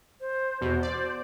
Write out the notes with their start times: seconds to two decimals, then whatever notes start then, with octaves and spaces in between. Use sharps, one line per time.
0.21 C5
0.61 E2 B2 C5
0.83 D5